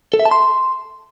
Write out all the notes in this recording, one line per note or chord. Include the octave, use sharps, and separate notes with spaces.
A4
E5
A5
C6